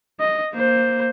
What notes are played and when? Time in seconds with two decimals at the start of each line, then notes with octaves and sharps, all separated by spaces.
0.20 D#5
0.53 A#3 C5